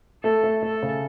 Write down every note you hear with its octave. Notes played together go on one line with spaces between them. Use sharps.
A3 A4
A3
A3 A4
C#3